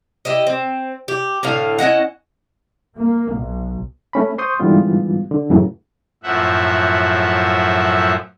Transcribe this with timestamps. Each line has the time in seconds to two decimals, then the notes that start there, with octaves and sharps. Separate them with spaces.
0.25 E4 G4 D#5
0.47 C4
1.08 G4
1.43 A2 D3 F5
1.79 C#4 E4 D#5 F#5
2.96 A#3
3.31 B1
4.13 A3 C#4 B5
4.38 C5 C6 C#6 D#6 G6
4.60 G#2 D3 E3 G3 B3 F4
5.31 D3
5.50 F#2 A2 C#3 E3 F#3
6.23 F#2 A2 F3 E5 F#5